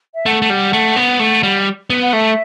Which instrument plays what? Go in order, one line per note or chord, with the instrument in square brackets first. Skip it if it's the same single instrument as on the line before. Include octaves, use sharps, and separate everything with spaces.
[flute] E5
[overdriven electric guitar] A3 [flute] F#5
[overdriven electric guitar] A3
G3
A3
B3
A3
G3
B3
[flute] F#5
[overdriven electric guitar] A3 [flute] E5